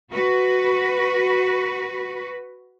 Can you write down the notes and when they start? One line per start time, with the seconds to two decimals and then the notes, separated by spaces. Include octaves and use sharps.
0.11 F#4 B4